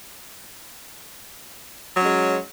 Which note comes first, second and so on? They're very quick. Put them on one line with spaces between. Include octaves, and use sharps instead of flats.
F#3 C#4 G#3